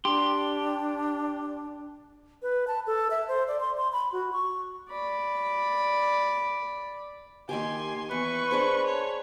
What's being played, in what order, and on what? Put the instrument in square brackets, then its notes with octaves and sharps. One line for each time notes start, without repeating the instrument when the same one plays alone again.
[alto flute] D4 [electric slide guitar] G4 [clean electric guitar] C6
[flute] B4
A5
A4
E5
C5
D5
C6
C6
B5
F#4
C#6
[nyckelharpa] D5 B5
[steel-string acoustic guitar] D#2 D#3 G4 [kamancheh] G#5 C6
[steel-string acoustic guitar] E2 [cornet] B4 [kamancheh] C#6
[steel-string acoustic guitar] D4 G#4 C5
[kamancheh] C#5